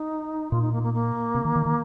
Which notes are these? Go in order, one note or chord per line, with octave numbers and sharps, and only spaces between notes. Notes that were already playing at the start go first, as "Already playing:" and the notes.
Already playing: D#4
A#2 F4
D#4
A#3
A#3
A#3
C3
D#3
D#3
D#3